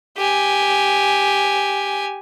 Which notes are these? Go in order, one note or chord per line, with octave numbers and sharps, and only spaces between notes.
G4 G#5